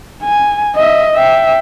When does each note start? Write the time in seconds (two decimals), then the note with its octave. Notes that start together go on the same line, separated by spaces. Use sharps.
0.23 G#5
0.75 D#5 E5
1.15 E5 G5